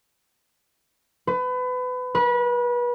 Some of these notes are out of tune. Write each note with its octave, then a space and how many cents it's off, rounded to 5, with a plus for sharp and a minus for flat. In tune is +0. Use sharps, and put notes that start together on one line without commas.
B4 +30
B4 -30